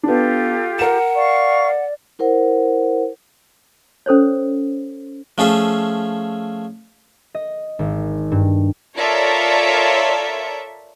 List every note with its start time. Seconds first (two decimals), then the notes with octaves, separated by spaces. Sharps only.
0.03 B3 D4 F4 G4 A4
0.79 A#4 F#5 E7
1.15 D5 F5 C#6
2.19 E4 A#4 C5 F#5
4.06 C#4 A4 C5 C#5
5.38 F3 A3 C#4 F4 G#4 E5
7.35 D#5
7.79 G#1
8.32 G2
8.96 F4 A4 A#4 C#5 D5 E5